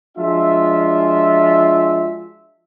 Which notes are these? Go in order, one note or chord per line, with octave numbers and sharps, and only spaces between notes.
F3 G#3 D4 F4 F#4 E5